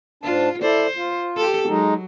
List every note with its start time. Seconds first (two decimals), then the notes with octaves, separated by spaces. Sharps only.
0.23 G#2 D4 F4 A5
0.62 E4 A4 C5 D5
0.96 F4
1.37 G4 A4
1.68 F#3 G#3 D#4